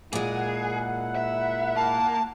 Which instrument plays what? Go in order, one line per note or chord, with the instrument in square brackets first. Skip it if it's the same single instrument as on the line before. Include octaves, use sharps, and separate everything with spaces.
[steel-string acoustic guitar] A#2 G#3 [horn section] E4 A#4 F#5 [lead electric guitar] G#4
[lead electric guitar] E5
[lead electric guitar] A#3 [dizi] A5